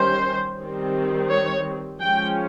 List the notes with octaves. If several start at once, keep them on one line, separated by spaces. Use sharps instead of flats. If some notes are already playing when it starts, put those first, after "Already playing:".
Already playing: D#3 G3 C#4 C5
D#3 G3 C4
C#5
F3 G#3 C#4 G5